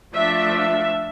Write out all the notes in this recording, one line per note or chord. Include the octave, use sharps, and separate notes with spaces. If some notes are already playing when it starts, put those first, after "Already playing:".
F3 A3 D4 E5
E5